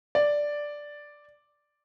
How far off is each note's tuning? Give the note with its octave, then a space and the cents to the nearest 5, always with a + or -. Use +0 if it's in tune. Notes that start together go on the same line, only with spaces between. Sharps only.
D5 +0